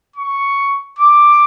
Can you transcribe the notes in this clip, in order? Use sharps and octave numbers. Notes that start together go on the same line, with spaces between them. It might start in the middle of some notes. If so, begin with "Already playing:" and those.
C#6
D6